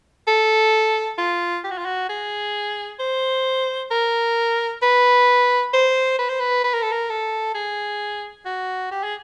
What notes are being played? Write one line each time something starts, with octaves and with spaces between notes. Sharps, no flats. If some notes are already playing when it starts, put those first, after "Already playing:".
A4
F4
G4
F#4
F4
F#4
G#4
C5
A#4
B4
C5
B4
C5
B4
B4
A#4
A4
A#4
A4
G#4
F#4
G4
G#4